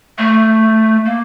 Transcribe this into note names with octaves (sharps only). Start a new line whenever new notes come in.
A3
A#3